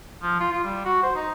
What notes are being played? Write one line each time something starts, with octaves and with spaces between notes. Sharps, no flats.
F3
F4
F4
G3
F#4
C5
D#4